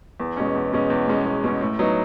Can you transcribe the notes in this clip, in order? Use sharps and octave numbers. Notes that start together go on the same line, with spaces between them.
E2
B2 G#3 C#4
E2
B2 G#3 C#4
E2
B2 G#3 C#4
E2
B2 G#3 C#4
A2
F#3 B3 D#4